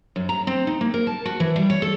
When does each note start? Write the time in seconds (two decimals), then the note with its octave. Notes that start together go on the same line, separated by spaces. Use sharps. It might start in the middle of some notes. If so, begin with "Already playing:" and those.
0.16 F#2
0.29 A#5
0.47 C4
0.67 D#4
0.81 A#3
0.94 A#4
1.07 A5
1.25 F#4
1.40 E3
1.56 G3
1.70 C#5
1.82 A4